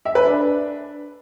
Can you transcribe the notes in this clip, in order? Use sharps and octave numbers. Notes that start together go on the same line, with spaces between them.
E5
B4
D4